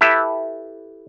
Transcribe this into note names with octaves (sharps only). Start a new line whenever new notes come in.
E4 G4 A4 B4 E5